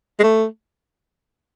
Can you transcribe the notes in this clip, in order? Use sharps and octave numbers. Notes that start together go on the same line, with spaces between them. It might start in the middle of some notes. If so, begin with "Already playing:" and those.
G#3
A3